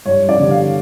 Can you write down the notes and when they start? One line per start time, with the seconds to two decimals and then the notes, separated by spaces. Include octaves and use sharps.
0.05 G2 C#5
0.29 D5
0.39 D3 G3
0.50 F5